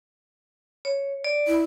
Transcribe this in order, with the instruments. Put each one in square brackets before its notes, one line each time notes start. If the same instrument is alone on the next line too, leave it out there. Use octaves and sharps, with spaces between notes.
[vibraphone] C#5
D5
[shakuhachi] E4